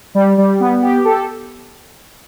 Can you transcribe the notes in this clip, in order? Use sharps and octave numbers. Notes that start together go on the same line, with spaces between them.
G3
G3
B3
G4
A4